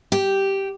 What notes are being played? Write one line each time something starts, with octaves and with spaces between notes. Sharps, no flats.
G4